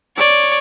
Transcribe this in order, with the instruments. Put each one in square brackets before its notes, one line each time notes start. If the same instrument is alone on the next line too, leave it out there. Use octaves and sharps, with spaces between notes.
[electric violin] C#5 [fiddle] D5